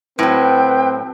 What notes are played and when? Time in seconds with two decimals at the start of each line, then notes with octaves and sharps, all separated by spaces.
0.19 A2 F#3 C4 B4 G5